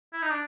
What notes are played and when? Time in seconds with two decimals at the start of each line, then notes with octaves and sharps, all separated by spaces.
0.13 E4
0.22 D#4
0.31 D4